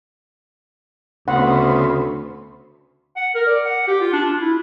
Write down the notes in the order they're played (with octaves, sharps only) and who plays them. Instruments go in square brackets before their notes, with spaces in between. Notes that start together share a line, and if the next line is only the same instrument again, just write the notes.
[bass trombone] D2 [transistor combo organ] C#3 B3 C4 [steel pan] F#5
[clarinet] F#5
A#4
D5
F#5
G4
F4
D4
F4
E4